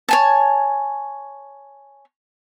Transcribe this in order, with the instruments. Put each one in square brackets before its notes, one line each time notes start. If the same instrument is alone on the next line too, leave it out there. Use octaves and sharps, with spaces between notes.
[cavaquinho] C#5 G#5 A5